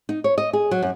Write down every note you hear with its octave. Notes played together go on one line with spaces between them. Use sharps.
D#4
C#5
D#5
G#4
F#3
F#2